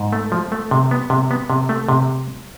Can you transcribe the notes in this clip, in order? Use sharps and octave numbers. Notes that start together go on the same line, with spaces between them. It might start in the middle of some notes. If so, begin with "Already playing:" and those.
Already playing: G#2
A3
F3
A3
C3
B3
C3
B3
C3
A3
C3